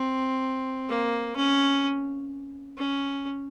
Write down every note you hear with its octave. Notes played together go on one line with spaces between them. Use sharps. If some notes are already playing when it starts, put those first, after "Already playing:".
Already playing: C4
A#3
C#4
C#4